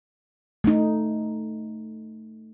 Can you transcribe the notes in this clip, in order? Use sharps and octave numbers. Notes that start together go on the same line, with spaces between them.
A3 D#4